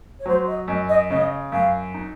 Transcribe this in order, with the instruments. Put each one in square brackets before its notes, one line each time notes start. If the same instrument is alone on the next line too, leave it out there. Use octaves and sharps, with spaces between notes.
[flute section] C#5
[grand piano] F#3 [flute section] C5
[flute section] D#5
[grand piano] F#2 [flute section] D#5
[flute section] D#5
[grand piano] C#3 [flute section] D#5
[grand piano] F#2 [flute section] F5
[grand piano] D#4